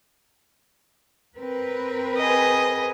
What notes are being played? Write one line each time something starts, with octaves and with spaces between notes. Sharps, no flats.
C4 A#4 B4
G#4 D#5